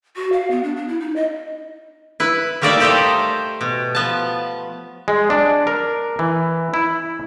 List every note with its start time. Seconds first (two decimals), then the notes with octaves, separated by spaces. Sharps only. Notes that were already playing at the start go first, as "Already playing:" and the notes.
0.16 F#4
0.33 F5
0.51 B3
0.63 D4
0.76 D4
0.88 E4
1.00 D#4
1.16 D#5
2.20 E4 B4
2.62 G3 A3 A#3 D#4 D5 E5
2.80 G4 A4 C5 D#5 E5 G5
3.61 B2
3.95 F3 B3 A5
5.08 G#3
5.30 D4
5.67 A#4
6.19 E3
6.74 E4